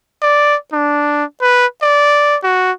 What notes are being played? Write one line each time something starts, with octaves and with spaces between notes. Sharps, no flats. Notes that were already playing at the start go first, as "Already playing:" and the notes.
D5
D4
B4
D5
F#4